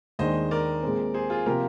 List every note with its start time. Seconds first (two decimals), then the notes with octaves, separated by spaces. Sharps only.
0.19 D#2 D#3 G#3 D4 G#4 C5 D#5
0.51 A#4 D5
0.82 A#2 G#3 C4
1.14 G#4 C5
1.30 F4 G#4
1.46 C3 F3 A#3 F4 G4 A#4